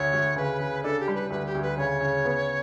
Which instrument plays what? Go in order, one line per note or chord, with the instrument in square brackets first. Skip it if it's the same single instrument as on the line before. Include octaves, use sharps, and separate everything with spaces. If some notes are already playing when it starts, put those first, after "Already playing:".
Already playing: [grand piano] D2 [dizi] C#5
[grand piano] D2
[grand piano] C#3 [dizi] B4
[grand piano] C#3
[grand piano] D4 [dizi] A4
[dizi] G4
[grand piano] G3
[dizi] B4
[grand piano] D2 [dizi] B4
[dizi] G4
[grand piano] D2
[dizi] B4
[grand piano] C#3 [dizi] C#5
[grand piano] C#3
B3